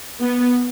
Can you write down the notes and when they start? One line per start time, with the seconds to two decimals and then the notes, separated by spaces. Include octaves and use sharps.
0.21 B3